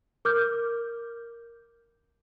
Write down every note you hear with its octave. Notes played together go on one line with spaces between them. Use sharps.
A#4 D6 F6 G6